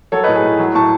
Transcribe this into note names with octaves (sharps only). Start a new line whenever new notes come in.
F#3 A4 C#5
B4 D#5
A2
G#4 B4
A2
F#3
A2 A5 C#6